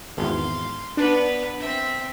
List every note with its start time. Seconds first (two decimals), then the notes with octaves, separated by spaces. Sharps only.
0.17 G#1 E2 F5 C6
0.97 B3 D4 B4
1.60 C4 E5